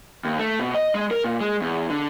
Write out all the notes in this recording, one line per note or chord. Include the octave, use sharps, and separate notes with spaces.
D#2
A3
B2
D#5
G#3
A#4
A#2
G#3
E2
D3